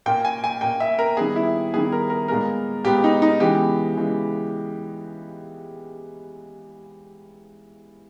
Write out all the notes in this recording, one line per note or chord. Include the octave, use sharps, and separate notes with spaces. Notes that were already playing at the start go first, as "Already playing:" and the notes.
A#2 A#3 G5
G#5
G#5
A#2 A#3 G5
E5
A#4
D#3 G3 B3 G#4
E4
D#3 G3 B3 G#4
A#4
A#4
A#2 G#3 B3 A#4
A#2 G#3 B3 G4
D#4
D#4
C#3 E3 G#3 B3 G4
C#3 E3 G#3